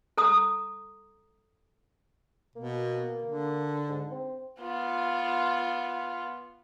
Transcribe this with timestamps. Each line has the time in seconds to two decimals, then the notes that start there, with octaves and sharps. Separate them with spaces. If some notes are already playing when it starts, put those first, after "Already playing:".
0.17 A4 A#5 D#6
2.56 B2 A#3
3.24 D3
3.88 G#2
4.11 C4
4.60 B3 F4